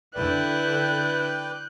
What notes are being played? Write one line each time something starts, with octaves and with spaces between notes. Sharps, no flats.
D3 E4 B4 D5 G5 F#6 G6